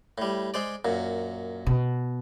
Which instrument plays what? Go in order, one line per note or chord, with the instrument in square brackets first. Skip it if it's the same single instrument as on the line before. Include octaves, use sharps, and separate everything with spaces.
[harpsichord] A2 G3
G#3 C5 D5
F#2 A#2
[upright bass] B2